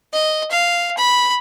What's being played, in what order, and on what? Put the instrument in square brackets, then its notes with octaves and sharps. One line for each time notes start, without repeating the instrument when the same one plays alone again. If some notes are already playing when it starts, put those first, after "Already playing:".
[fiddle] D#5
F5
B5